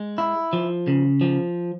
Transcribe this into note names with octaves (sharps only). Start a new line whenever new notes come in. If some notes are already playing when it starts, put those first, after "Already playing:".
Already playing: G#3
E4
F3
C#3
F3